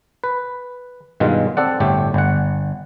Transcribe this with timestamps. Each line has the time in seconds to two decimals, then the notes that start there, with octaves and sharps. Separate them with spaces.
0.24 B4
1.20 G2 B2 D#3 G#3 F4
1.57 C4 A4 D5 F#5
1.80 G1 A2 A3 G4
2.14 G1 F#5